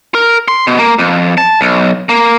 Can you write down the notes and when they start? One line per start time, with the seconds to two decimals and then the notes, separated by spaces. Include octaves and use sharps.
0.15 A#4
0.48 C6
0.67 B2
0.79 A#3
0.98 F2
1.38 A5
1.61 B1
2.09 A#3